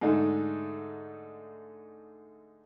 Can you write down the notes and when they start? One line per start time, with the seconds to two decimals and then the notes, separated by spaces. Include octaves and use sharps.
0.01 G#2 D3 A3 D#4